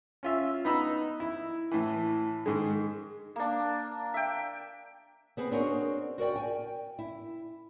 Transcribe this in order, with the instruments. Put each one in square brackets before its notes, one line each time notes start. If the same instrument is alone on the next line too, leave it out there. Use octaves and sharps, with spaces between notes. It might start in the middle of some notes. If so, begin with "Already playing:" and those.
[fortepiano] C#4 F4 E5
B3 D#4 B5 E6
E4
A2 E3
G#2 D#3 G#3
[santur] A#3 D4
E5 G5
[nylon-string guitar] B3 C4 G#4 B4
C4 D4 F#4 G#4 A#4 C#5
F#4 A#4 D5 G5
G5 G#5
E4